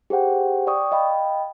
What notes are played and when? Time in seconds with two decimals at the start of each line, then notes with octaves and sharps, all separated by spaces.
0.10 G4 G#4 C5 F#5 G5
0.67 D5 G5 C#6 D#6
0.92 D#5 F5 G5 B5